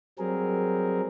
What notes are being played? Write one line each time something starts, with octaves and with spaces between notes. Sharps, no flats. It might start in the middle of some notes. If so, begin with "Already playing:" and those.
F#3 G3 C4 G#4 A#4